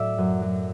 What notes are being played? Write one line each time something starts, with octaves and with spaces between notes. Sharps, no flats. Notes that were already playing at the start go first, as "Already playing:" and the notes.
Already playing: A2 F#3 D5 E5
F#2
F#3